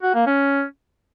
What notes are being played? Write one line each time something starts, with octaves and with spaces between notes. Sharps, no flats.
F#4
A#3
C#4